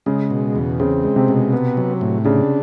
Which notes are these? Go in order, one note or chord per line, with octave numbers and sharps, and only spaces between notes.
C#3 G#3
B2
E2
C#3 C4
G#3
C3
B2
B3
F#3
A2
C#3 D4